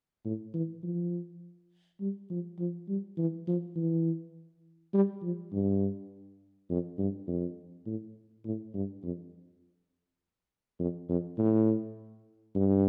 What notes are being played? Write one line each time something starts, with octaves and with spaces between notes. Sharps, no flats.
A2
E3
F3
G3
F3
F3
G3
E3
F3
E3
G3
F3
G2
F2
G2
F2
A2
A2
G2
F2
F2
F2
A2
G2